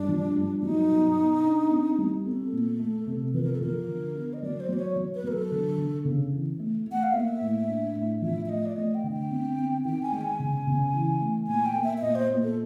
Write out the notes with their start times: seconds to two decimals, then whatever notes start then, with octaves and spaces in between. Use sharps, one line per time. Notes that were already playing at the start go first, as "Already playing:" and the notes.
Already playing: G2 D4
0.08 F3
0.36 G2
0.62 F#3 D#4
0.89 B2
1.16 B2
1.44 D4
1.71 C4
1.98 G3
2.25 C4 A4
2.52 A#2
2.79 A3
3.07 C3
3.34 F3 B4
3.43 A#4
3.52 A4
3.61 F3 A#4
3.88 D3
4.15 B3
4.33 D#5
4.42 F#3 D5
4.60 C5
4.69 F#3 D5
4.79 C#5
4.96 F#3
5.15 B4
5.24 F#3 A#4
5.32 A4
5.51 D3
5.78 D3
6.05 C#3
6.33 E3
6.59 A3
6.87 A3
6.92 F#5
7.03 F5
7.13 A#3 E5
7.41 A2
7.68 D4
7.95 A2
8.22 F3 E5
8.46 E5
8.49 A3 D#5
8.65 D5
8.76 A3 D#5
8.95 G5
9.03 D3
9.12 G5
9.31 C4
9.58 C4
9.85 D#3 G5
10.02 G#5
10.12 G#3 G5
10.21 G#5
10.39 C#3
10.67 C#3
10.93 E3
11.20 A3
11.48 A#2 G#5
11.66 G5
11.75 A#3
11.84 E5
11.97 E5
12.01 A#2 D#5
12.15 C5
12.30 A#2
12.43 A4